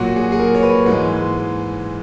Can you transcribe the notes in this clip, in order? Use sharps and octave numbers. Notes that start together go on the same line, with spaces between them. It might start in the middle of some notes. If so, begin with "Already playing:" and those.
Already playing: A#2 F#3 F#4
G#4
G#4
A#4
C#5
B4
G#2 E3 G#3 G#4